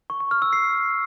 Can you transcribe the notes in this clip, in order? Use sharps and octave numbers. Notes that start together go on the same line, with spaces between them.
C#6
C#6
F6
E6
C7